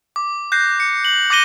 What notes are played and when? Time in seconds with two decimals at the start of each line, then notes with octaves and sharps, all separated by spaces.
0.16 D6
0.52 F#6 G6 A#6 C7
0.80 C#7
1.05 F#7
1.30 D6 G6 A#6 D#7 G7